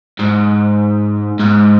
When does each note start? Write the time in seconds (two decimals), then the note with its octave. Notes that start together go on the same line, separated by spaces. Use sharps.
0.19 G#2
1.39 G#2